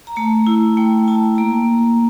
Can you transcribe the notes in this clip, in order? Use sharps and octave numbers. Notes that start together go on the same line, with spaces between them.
A#5
A3 A5
E4
A3 G5
E4 A5
A#3 A#5